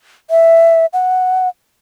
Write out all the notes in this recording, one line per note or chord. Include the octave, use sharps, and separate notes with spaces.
E5
F#5